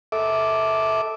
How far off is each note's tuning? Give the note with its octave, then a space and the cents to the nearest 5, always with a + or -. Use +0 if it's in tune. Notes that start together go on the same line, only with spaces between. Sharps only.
A4 +0 E5 -20 D6 +0